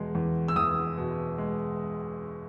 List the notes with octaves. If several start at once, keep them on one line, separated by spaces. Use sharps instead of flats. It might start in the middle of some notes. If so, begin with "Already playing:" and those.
Already playing: E2 B2 G#3
E2
E6
E2 D#6
B2
G#3